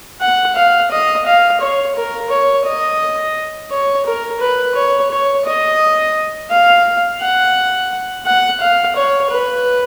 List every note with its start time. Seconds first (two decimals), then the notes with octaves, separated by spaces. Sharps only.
0.21 F#5
0.56 F5
0.91 D#5
1.26 F5
1.61 C#5
1.96 A#4
2.30 C#5
2.65 D#5
3.71 C#5
4.06 A#4
4.41 B4
4.75 C#5
5.10 C#5
5.45 D#5
6.51 F5
7.21 F#5
8.25 F#5
8.60 F5
8.96 C#5
9.30 B4